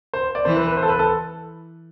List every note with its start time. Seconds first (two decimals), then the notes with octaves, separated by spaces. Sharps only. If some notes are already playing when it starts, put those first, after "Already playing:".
0.14 C5
0.35 D5
0.45 E3 C5
0.56 B4
0.67 B4
0.77 C5
0.83 A4
0.88 B4
0.99 A4